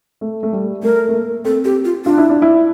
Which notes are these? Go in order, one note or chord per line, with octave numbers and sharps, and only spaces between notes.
A3
A3
G3
A3 A#4
A3
A#3
C4 A4
C4 G4
F4
D4 F4
E4
D4
E4